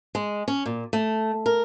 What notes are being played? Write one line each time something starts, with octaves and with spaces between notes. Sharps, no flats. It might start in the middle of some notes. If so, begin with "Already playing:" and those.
G#3
C#4
A#2
A3
A#4